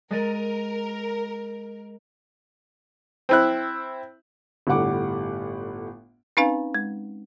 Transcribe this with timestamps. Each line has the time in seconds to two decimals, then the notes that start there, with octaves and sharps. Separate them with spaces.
0.11 G#3 A#4 A6 D#7
3.29 C4 E4 F#6
4.67 G1 A2 G3 F#5 D6
6.37 C4 C#4 D#4 B4 F5 G#5
6.75 G#3